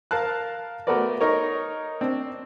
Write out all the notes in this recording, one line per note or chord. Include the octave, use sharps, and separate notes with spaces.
A#4 F5 A5 F#6
A3 B3 F#4 A#4 B4 D5
D#4 A#4 C#5
C4 D4